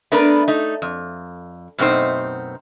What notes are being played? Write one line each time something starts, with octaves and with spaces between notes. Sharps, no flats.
A3 B3 D4 A#4 B4
A3 D#4
F2
F#2 B2 A3 C4 D#4 C5